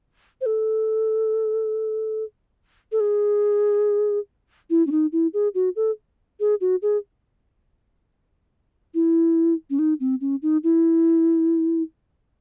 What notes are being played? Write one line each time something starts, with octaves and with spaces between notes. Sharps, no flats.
C5
A4
A4
G#4
E4
C#4
D#4
E4
G#4
F#4
A4
G#4
F#4
G#4
E4
C#4
D#4
C4
C#4
D#4
E4